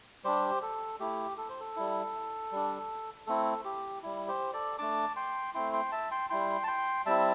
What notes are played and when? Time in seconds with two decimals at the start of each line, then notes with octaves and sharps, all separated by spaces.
0.24 G3 D4 G4 C5
0.62 A4
1.00 A3 E4 G4
1.38 A4
1.49 C5
1.60 A4
1.76 G3 E4
2.52 G3 D4
3.27 A3 C4 E4 A4
3.65 G4
4.03 G3 E4
4.28 G4 C5
4.53 A4 D5
4.78 A3 D4 A5 D6
5.16 G5 C6
5.54 A3 C4 E4 G5 C6
5.73 G5 C6
5.92 E5 A5
6.11 G5 C6
6.30 G3 E4 G5 C6
6.64 A5
6.67 G5 C6
7.06 G3 C4 E4 E5 A5